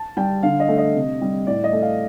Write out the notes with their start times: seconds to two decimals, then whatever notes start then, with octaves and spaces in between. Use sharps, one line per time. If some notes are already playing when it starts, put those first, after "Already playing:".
Already playing: A5
0.17 G3 G5
0.43 D3 F5
0.60 D#5
0.69 A3
0.78 D#5
0.94 C3
1.21 G3
1.46 A2 D5
1.64 D#5
1.73 A3
1.82 F5